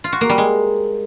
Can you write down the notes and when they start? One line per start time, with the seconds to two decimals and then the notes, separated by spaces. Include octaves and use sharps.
0.04 F4
0.13 F#4
0.21 A#3
0.29 G3
0.38 G#3